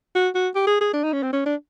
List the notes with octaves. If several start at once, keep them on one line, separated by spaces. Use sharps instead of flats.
F#4
F#4
G4
G#4
G#4
D4
D#4
C#4
C4
C#4
D4